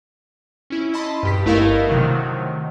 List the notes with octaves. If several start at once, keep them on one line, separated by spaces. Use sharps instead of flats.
C#4 E4
D#5 A5 B5 C6
G2 G4 B6
G1 A3 E4 A#4 D#5 F5
C3 D#3 F#3 A3